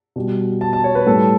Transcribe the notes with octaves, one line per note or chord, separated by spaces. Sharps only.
B2 G3
A5
A5
C#5
B4
A2 G3 A4